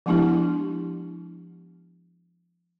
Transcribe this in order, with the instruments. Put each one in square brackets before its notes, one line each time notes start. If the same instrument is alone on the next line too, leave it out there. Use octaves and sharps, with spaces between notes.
[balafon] F3 G#3 B3 D4 E4 G4